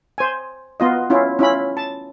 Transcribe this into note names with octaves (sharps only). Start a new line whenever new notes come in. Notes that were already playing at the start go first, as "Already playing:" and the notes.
C5 G#5
B3 F4 D#5
C#4 E4 F4
C#4 E4 F4 B5
A5